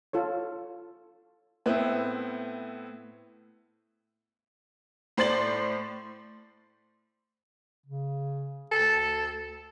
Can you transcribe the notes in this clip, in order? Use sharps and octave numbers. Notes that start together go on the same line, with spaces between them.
F4 A4 C#5
A2 B3 C4 E4
A2 C5 D5 A6 F#7
C#3
D2 A4